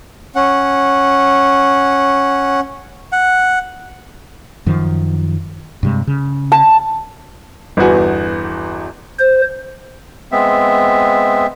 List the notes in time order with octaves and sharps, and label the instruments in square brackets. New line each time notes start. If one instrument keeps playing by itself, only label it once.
[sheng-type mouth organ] C#4 F#5
[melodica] F#5
[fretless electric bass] F#2 D#3 F3
G2 C3 G#3
C#3
[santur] A5
[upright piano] G1 E2 B3 F#4 G#5
[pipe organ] C5
[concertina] G#3 B3 C4 E5